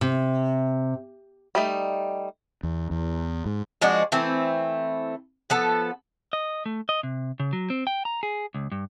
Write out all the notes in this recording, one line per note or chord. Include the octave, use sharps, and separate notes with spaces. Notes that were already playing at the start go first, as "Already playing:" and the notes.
C3
G3 A3 D#4
E2
E2
G#2
F3 G#3 D4 F#4
E3 A3 C4
F3 B3 A4
D#5
A3
D#5
C3
C#3
F#3
C4
G5
A#5
G#4
C#2
G2